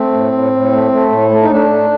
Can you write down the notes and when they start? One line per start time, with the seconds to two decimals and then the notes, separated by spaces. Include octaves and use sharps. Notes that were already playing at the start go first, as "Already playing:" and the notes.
Already playing: A3 C4
0.13 A2
0.33 A2
0.53 A2
0.72 A3
0.92 A3
1.11 A2
1.31 A3
1.42 D#4
1.51 A3 D4
1.70 A3